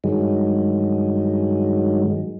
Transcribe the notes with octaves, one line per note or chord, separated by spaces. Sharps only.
G2 D#3 F#3 G#3